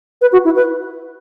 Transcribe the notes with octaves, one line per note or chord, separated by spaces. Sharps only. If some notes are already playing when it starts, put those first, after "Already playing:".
B4
F#4
E4
B4